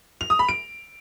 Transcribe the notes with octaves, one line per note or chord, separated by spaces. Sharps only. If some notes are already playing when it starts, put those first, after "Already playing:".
F7
D#6
B5
D7